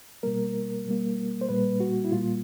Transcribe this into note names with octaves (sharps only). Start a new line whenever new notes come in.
B2 G3 A#3 A#4
B2 G3 A#3
C5
A#2 G3 A#3 B4
F#4
E4
A#2 G3 A#3 F4